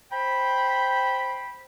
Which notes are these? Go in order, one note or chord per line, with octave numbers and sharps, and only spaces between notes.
C5 G5 B5